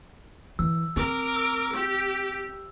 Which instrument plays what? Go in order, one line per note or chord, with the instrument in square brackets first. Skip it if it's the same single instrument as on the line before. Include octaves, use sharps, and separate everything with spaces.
[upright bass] E3 [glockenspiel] E6
[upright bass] C4 [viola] A#4 D6
[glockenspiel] E6
[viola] G4 [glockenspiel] E6